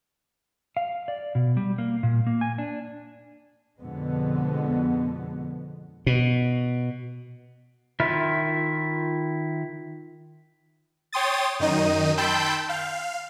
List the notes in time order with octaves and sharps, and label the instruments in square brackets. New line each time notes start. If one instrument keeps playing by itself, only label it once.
[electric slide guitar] F5
D5
B2
G3
A#3
A#2
A#3
G#5
D4
[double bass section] F2 B2 D3 G#3 B3
[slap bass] B2
[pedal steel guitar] D#3 E4 F4 E5 F6
[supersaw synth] C#5 G5 C6 D#6 A6
F#2 D#3 D#4 D#7
G5 A5 B5 C6 E6 G6
F5